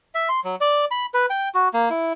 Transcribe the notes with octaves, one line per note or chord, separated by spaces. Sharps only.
E5
C6
F#3
D5
B5
B4
G5
F#4
A#3
E4